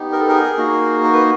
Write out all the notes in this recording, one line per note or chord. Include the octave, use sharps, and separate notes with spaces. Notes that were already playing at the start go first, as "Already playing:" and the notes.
Already playing: B3 D#4 G4
A#4
A4
G#4 A#4
A#3 D#4 F#4
A#4
B4